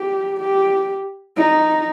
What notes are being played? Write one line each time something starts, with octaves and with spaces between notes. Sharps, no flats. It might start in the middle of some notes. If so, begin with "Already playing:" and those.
Already playing: G4
G4
D#4